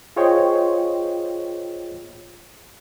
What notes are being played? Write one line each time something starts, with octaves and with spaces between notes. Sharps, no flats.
F4 G#4 C5 C#5 D#5 G5